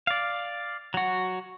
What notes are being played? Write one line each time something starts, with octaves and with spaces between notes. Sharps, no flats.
D5 F5
F#3 F#4